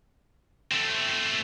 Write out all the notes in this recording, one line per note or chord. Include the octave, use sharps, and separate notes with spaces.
A3 C4